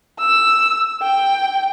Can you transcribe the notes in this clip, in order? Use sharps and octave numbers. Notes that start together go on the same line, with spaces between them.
E6
G5